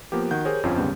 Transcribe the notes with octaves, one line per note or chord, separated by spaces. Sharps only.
F3 A#3 B3 G4
D#3 F#4 F#5 G6
G4 G#4 A#4 C5 C#5
G1 F2 C4 C#4 F4
D#2 G#2 C#3 G3 B3 C#4